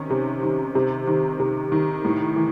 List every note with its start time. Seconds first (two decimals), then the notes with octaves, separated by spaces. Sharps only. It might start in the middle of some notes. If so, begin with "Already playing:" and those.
Already playing: C3 D#3 C#4
0.10 C3
0.43 D#3
0.75 C3
1.07 D#3
1.40 C3
1.72 D#3
2.05 A2
2.36 E3